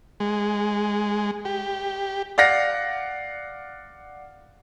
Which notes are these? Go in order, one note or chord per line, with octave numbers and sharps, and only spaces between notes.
G#3
G4
D5 F5 F#5 A#6